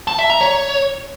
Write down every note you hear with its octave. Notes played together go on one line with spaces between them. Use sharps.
A5
E5
A#5
C#5